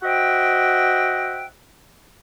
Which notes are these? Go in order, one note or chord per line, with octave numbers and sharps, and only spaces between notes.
F#4 C5 D#5 E5 F#5 G5